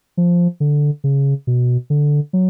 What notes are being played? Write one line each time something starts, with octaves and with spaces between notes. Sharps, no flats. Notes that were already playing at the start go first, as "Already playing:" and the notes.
F3
D3
C#3
B2
D3
F#3